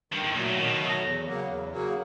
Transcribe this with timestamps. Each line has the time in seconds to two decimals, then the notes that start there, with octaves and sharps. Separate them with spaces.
0.12 G2 D#3
0.24 A2
0.35 A#2 F#3 A3
0.46 A#2
0.57 B2 D#3
0.80 F#3 A3
1.02 E2
1.26 C#3 F#3 A#3
1.48 E2
1.71 C#3 F#3 A#3